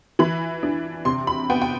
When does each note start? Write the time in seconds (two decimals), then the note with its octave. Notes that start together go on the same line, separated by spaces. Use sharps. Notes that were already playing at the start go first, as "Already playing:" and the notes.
0.19 E3 B5
0.63 D4
1.05 C3 C6
1.27 B5
1.50 B3 G5
1.62 G5